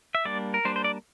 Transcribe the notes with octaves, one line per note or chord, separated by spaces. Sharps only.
E5
G3 A#3 D4 D5
A#4
G3 A#3 D4 C5
C5
D5